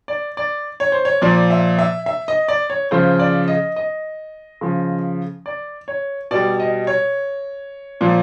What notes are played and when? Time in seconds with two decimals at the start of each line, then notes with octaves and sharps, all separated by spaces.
0.08 D5
0.37 D5
0.80 C#5
0.92 C5
1.05 C#5
1.22 A#2 F3 D5
1.50 E5
1.79 E5
2.06 E5
2.28 D#5
2.48 D5
2.70 C#5
2.91 C#3 F3 C5
3.19 D5
3.48 D#5
3.76 D#5
4.61 C#3 F3
5.46 D5
5.88 C#5
6.31 B2 G3 D5
6.60 D#5
6.87 C#5
8.01 A#2 F3